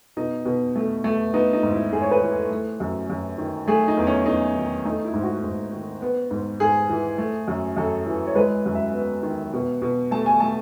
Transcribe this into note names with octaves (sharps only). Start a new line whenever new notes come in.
B2 D#4
B2
A3
A3
B3 D#4
D#4
G#2
E4
G#2 G#4
C#5
B4
E3
A4
A3
F#2
F#2
D#3
A3 G#4
D#4
E2
C#4
E2 D#4
D#3
A3 D#4
E4
G#2
F#4
G#2
D#3
B3
G#2
G#2 G#4
E3
A3
F#2
F#2 A4
E3
C#5
G#3 B4
F#2
E5
B3
D#3
B2
B2
A3 A5
G#5
A3 A5